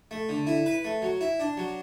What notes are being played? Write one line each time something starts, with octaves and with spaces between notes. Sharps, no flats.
A3
D3
E4
B4
A3
F#3
E4
D4
F#3